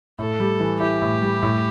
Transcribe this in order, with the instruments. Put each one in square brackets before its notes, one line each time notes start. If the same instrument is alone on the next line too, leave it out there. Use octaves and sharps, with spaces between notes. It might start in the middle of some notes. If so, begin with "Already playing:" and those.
[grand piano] A2 [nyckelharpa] A4
[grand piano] G3
E3
[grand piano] E4 [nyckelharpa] G4
[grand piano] A2
G3
A2